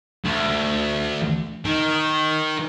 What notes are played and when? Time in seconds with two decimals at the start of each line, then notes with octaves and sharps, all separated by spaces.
0.25 D2
1.65 D#3